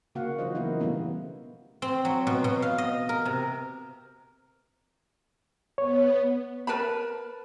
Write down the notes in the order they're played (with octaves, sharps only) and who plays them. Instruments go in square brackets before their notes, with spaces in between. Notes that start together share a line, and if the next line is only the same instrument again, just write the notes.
[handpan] C#3 A#3 F#4 F5 F#5
E3 F#3 D4 F4 C5 D#5
A#3 B3 D#4 E4
B2 E3 G3 A3 B3 C#4
[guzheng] C4
F#3
B2
B2
F5
D#5
A#4
C3
[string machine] B3 [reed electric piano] C#5
[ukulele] A#4 B4 A5 B5